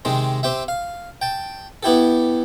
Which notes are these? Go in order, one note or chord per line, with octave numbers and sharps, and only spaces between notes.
C3 D#3 G#3 C4
C4 G4 E5
F5
G5 A5
B3 E4 G4 A4